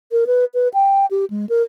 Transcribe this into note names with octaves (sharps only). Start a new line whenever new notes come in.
A#4
B4
B4
G5
G4
G#3
A#4